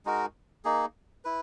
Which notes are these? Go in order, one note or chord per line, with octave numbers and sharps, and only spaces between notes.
G#3 D#4 F#4 A#4
A#3 D#4 G#4
E4 B4